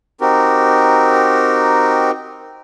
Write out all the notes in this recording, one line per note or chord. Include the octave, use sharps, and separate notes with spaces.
C4 D#4 F#4 G4 A#4